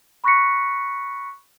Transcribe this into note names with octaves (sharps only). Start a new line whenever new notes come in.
B5 C#6 F#6 A#6 B6 C#7